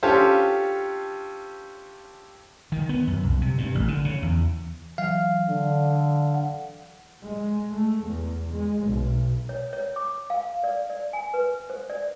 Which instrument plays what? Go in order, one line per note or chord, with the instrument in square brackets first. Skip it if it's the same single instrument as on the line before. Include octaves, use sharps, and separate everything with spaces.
[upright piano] C#4 D4 F4 G4 A4 C5
[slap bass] D#3
B3
F#2
C2
C3
G2
A1
D3
C#3
E2
[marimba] E3 F#3 [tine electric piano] F5
[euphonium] D3
[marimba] F#5
[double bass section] G#3
A3
E2
G#3
B1
[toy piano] C#5
C#5
D6
F5
D5
D5
G#5
B4
C5
D5